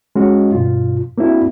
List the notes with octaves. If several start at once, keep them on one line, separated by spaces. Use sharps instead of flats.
G#3 C#4 F#4
G2 B2 F4
A#3 C4 D4 E4 F#4